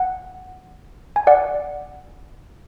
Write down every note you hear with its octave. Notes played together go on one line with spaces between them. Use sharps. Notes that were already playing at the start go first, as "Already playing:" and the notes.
Already playing: F#5
G#5
D5 F#5